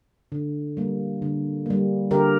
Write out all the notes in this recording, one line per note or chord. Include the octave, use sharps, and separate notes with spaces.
D3
G3 A#3
D3
G3 A#3
D3 G4 A#4